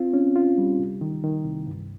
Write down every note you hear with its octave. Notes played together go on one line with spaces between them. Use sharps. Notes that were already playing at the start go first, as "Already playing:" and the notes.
Already playing: C4 F4
C#4
F4
G3
C2
D#3
D#3
C2
G2